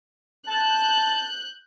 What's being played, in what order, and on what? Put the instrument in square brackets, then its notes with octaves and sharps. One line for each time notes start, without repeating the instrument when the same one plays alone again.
[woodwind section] A5 [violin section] F#6 G6